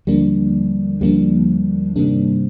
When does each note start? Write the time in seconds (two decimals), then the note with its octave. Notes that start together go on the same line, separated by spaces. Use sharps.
0.07 D#2 D3 F3 G3 A#3 D4
1.01 D#2 D3 F3 G3 A#3 D4
1.96 G2 C3 D#3 G3 A#3 D4